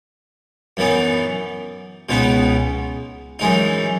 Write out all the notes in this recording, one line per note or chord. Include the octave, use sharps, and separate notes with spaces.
F#2 E3 B3 D#4
C#2 B2 G#3 B3 D#4
F#2 E3 G#3 D#4